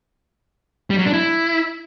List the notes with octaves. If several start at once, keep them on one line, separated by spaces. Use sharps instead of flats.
G3
F#3
D4
E4